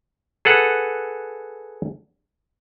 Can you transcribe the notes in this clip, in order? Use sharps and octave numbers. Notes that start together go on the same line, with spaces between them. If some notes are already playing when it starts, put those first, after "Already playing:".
G#4 A4 B4 F#5